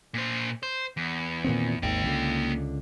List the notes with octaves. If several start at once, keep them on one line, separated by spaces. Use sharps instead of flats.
A#2 C5
C5
E2
A#2 D#3 C4
G#1 D#2 A#3 G5
C#2 D3